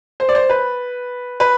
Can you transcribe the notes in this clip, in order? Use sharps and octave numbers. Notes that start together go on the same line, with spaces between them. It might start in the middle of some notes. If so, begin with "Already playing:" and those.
C5
D5
C5
B4
B4